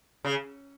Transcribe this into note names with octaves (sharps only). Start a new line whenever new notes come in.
C#3